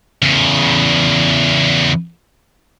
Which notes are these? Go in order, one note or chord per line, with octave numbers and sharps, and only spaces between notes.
E2 C#3